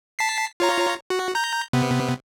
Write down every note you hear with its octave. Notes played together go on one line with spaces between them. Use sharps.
A5 B6 C7
F4 C#5 A#5
F#4
A#5 G6
C3 B3